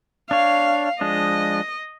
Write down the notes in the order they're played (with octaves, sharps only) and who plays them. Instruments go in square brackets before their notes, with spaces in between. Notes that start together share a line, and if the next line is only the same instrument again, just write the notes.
[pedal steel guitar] D4 C#5 [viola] F5
[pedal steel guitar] F3 G#3 D4 [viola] D#5